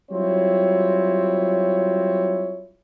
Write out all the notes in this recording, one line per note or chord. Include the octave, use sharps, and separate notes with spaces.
F#3 G3 C4 E4 F4 C#5